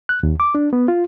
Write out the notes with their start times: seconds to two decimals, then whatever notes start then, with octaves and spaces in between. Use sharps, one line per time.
0.09 F#6
0.23 D#2
0.40 D6
0.55 D4
0.73 B3
0.88 F4